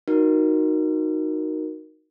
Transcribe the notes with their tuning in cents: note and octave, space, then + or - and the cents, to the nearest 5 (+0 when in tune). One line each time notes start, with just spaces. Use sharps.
D#4 +0 F#4 +0 A#4 +10